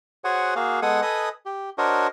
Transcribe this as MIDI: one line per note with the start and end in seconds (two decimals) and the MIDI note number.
0.24 0.54 66
0.24 0.54 68
0.24 0.54 72
0.24 0.54 73
0.24 0.54 78
0.24 0.54 80
0.56 0.80 58
0.56 0.80 66
0.56 0.80 68
0.56 0.80 77
0.82 1.01 56
0.82 1.01 59
0.82 1.01 69
0.82 1.01 78
0.82 1.01 80
0.82 1.01 87
1.02 1.29 69
1.02 1.29 71
1.02 1.29 75
1.02 1.29 80
1.02 1.29 87
1.46 1.70 67
1.78 2.07 62
1.78 2.07 66
1.78 2.07 70
1.78 2.07 72
1.78 2.07 73
1.78 2.07 75